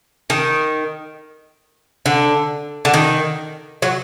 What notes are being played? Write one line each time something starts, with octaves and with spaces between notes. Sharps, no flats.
D#3
D3
D3
D#3
F#3